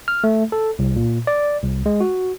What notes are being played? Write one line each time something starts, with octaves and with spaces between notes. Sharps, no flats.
F6
A3
A4
C2
A#2
D5
C2
G#3
F#4